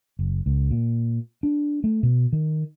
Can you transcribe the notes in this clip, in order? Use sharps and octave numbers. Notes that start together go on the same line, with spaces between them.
F#1
C#2
A#2
D4
A3
B2
D#3